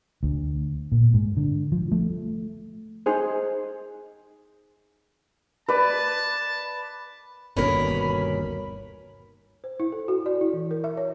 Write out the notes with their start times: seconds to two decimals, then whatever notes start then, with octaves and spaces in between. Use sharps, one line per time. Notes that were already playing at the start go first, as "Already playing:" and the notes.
0.23 D2
0.92 A#2
1.14 G#2
1.37 D3
1.72 F3
1.92 A3
3.06 D#4 G#4 C5
5.69 B4 D5 A5
7.56 G1 D#2 B2 C#4 A#4 B5
9.64 C5
9.80 E4
9.92 A4
10.08 F#4
10.26 D5
10.41 E4
10.53 E3
10.71 A#4
10.84 E5
10.97 C#5